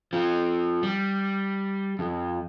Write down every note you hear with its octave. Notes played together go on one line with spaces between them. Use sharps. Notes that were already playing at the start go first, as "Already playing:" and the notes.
F3 C4
G3
F2